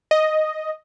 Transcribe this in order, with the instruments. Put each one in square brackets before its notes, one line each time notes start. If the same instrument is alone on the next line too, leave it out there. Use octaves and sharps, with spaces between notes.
[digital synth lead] D#5